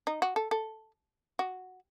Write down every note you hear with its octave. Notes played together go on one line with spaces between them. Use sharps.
D#4
F#4
A4
A4
F#4